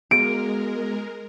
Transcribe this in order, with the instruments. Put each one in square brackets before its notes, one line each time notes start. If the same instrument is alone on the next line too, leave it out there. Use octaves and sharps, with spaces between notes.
[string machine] G#3 A#4 [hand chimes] B3 F#4 G#4 [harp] D7